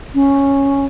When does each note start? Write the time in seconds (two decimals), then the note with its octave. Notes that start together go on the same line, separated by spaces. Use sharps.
0.15 C#4